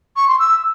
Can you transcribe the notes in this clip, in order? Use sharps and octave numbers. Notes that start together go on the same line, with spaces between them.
C#6
C6
E6